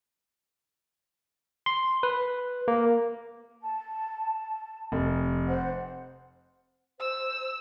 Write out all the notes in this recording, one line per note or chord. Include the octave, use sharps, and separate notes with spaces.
C6
B4
A#3
A5
F1
C5 F#5
C5 E6